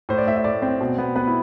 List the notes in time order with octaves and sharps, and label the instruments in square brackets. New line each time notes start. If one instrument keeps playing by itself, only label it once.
[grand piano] A2 C5
D5
A2 E5
E5
A2 D5
C4
B2
B3
B3 B4
E4